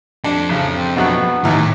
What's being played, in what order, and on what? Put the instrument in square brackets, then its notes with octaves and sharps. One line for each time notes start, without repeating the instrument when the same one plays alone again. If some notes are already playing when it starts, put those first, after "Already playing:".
[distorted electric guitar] F2 A4 [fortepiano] D4
[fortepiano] A1 [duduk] C#3
[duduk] C4
[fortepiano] A#1 B2 F#3 [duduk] B3
[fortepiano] D#2 E3 [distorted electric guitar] A2 E4 [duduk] D#4